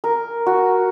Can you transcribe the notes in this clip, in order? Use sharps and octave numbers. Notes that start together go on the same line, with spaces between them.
A#4
F#4